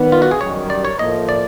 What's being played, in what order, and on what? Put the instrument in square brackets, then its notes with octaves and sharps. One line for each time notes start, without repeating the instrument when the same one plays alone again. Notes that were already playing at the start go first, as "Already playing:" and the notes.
Already playing: [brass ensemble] D#3 G3 B3
[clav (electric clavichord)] F4
F#4
G#4
[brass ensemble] F#2 D#3 G3 [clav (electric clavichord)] C#5
[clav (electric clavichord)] D5
C#5
[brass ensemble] A2 F3 A#3 [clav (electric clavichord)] D#5
[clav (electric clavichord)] D5